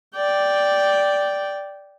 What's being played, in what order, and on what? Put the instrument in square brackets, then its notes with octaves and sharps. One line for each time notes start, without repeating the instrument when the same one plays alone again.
[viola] D5 G5